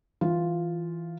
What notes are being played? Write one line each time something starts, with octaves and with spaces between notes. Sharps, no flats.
E3 F4